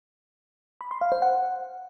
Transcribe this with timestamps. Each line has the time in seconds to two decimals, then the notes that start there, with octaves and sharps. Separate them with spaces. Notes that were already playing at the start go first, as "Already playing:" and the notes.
0.81 B5
0.91 C6
1.01 F5
1.12 C5
1.22 F#5